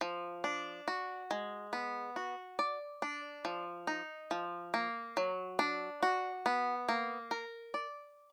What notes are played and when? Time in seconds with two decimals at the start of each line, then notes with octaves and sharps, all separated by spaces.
0.01 F3
0.44 D4
0.88 F#4
1.31 G#3
1.73 B3
2.16 F#4
2.59 D5
3.02 D4
3.45 F3
3.87 D#4
4.31 F3
4.74 A#3
5.17 F#3
5.59 D4
6.03 F#4
6.46 B3
6.89 A#3
7.31 A#4
7.74 D5